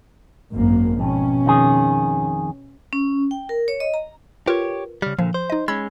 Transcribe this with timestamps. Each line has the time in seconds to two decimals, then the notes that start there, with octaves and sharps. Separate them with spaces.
0.54 G#1 F#2 A#3
0.99 F2 B2 C#4
1.46 F2 D#3 G#4
2.93 C#4
3.31 G5
3.49 A#4
3.68 C#5
3.80 D#5
3.94 A#5
4.47 F4 G4 A#4 B4 C#5
5.02 C#3 G3 F6
5.19 A#2 D3 F3
5.34 C5
5.50 D#4 D#5
5.68 G#3 C#4 B5 E6 G#6